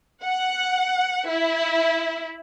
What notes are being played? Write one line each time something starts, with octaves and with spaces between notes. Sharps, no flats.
F#5
E4